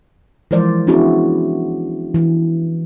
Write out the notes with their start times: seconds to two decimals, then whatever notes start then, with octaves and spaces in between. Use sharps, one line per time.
0.51 E3 F3 G#3 A#4 C5 D5
0.87 B3 C#4 D4 E4 F#4 G#4
2.15 E3